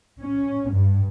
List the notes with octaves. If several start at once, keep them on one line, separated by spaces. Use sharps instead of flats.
C#4
G2